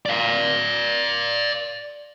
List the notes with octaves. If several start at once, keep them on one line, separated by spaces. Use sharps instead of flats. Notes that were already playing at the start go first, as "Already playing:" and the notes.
D5 F5